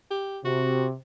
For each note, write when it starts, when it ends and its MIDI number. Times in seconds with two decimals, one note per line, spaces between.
0.11 0.40 67
0.45 0.93 48
0.45 0.86 66